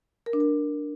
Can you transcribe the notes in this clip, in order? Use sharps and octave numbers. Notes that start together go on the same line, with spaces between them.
A#4
D4
A#4